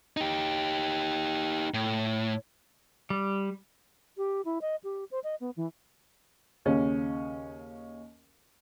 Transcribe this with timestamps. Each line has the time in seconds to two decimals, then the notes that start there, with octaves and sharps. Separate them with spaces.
0.17 D#4 G4
1.74 A2
3.10 G3
4.17 G4
4.45 E4
4.62 D#5
4.84 G4
5.11 C5
5.24 D#5
5.40 B3
5.57 E3
6.66 D#2 C#3 C#4